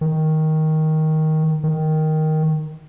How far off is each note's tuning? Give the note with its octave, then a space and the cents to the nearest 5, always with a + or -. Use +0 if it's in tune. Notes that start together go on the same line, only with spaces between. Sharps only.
D#3 +10
D#3 +5